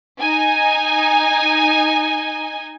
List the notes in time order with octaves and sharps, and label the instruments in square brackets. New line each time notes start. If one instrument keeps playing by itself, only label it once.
[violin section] D#4 G#5